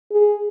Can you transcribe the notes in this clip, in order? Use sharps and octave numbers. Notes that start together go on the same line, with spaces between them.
G#4